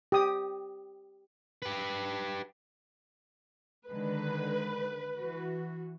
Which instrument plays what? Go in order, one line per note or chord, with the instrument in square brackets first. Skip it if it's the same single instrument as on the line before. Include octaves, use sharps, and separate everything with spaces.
[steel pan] G4 D#6
[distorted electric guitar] G4 B4
[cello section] D3 D#3 G#3 [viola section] B4
[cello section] E3 F#4